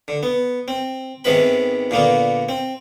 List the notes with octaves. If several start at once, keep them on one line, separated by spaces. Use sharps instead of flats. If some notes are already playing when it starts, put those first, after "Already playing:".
D3
B3
C4
G#2 C3 D#3 B3 B4 B5
A#2 D3 A#3 B3
C4